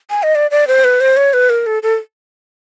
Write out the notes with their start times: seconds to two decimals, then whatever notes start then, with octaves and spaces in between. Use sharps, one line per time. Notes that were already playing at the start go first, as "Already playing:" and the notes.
0.10 G#5
0.23 D#5
0.35 D5
0.51 D5
0.68 C5
0.84 B4
1.01 C5
1.17 C#5
1.33 B4
1.50 A#4
1.66 A4
1.83 A4